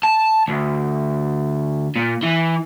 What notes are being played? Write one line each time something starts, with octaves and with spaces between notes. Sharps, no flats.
A5
D2
A#2
E3